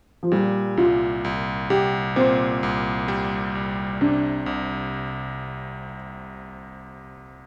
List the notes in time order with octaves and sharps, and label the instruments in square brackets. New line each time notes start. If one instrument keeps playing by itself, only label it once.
[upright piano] F3
[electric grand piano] A#2 [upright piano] G3
[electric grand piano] C2 [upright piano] F4
[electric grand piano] C2
[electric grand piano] C2 [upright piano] G4
[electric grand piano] A#2 [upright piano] C4
[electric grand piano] C2
G3
C2
[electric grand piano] C3 [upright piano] D4
[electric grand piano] C2